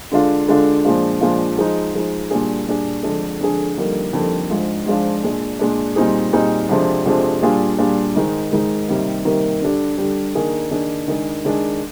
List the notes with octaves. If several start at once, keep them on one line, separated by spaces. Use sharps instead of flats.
D3 G#3 D4 F4
D3 G#3 D4 F4
A#2 F3 G#3 D4 F4
A#2 F3 G#3 D4 F4
F3 G#3 D#4
F3 G#3 D#4
A#2 G3 D4 G#4
A#2 G3 D4 G#4
F2 D3 G#3 D4 G#4
F2 D3 G#3 D4 G#4
F2 D3 G3 A#3 D#4
F2 D3 G3 A#3 D#4
G#2 F3 G#3 D4 F4
G#2 F3 G#3 D4 F4
A#2 G#3 D4
A#2 G#3 D4
A#2 G3 C4 D#4 G#4
A#2 G3 C4 D#4 G#4
F2 C3 F3 G#3 D4
F2 C3 F3 G#3 D4
A#2 G3 D4 F4 G#4
A#2 G3 D4 F4 G#4
G#2 D#3 G#3 D#4
G#2 D#3 G#3 D#4
C3 D#3 G3 A#3
C3 D#3 G3 A#3
D3 G3 D4 G4
D3 G3 D4 G4
D#3 A#3 D4 G#4
D#3 A#3 D4 G#4
D#3 G#3 D4 G#4
D#3 G#3 D4 G#4